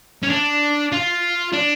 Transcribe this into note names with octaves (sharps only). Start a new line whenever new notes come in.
C#4
D4
F4
D4